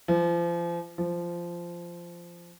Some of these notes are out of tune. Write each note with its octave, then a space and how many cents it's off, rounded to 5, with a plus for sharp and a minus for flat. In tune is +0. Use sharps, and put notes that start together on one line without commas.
F3 -35
F3 -15